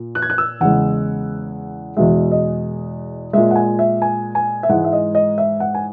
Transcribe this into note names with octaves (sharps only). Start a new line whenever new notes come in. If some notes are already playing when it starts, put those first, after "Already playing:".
Already playing: A#2
F#6
G#6
F#6
E6
E2 C#3 E3 G#3 F#5
E2 B2 G#3 E5
D#5
A#2 G#3 E5
F#5
G#5
E5
G#5
G#5
E5
G#2 E3 G#3 F#5
E5
D#5
D#5
E5
F#5
G#5